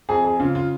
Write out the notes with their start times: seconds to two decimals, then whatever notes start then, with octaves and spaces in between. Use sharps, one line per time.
0.09 F2 G#4
0.24 G#4
0.40 C#3 F4
0.55 F4